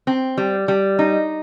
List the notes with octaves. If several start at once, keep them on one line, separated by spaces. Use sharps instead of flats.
C4
G3
G3
D#4